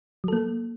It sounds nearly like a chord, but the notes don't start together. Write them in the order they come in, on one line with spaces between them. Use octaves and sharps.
F#3 A4 A#3